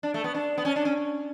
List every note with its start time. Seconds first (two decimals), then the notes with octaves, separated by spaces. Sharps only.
0.03 D4
0.14 A3
0.24 B3
0.35 D4
0.58 B3
0.65 C#4
0.76 D4
0.85 C#4